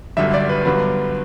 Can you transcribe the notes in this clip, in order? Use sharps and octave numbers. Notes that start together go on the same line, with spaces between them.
G1 F#2 D3 G3 E5
D5
B4
G2 D3 F#3 B3